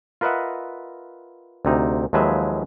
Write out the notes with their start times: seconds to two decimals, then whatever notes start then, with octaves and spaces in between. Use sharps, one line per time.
0.21 F4 A#4 B4 D#5 E5 F#5
1.65 D2 C3 D#4
2.13 D#2 F3 F#3 G#3 B4 E5